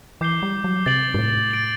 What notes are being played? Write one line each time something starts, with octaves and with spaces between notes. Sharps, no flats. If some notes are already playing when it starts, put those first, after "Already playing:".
E3 D6 G6 C7 G7
G3
F#3
C3 A6 D7 F#7
G2
A2
A6 D7 F#7